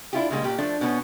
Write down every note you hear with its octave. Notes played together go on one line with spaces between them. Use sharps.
D4 E4 F4 G4
A#2 C#3 G3 G#3 A#3
A#2 G4
F3 A3 D4
B2 B3 C#4